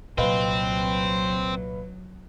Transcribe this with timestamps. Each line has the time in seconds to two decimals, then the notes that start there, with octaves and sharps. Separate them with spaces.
0.18 C2 A#2 F#3 C4 B4 D#5 F5